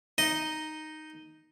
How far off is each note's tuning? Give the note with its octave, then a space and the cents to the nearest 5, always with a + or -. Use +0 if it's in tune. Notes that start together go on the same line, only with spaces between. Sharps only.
D#4 +0 D#5 +0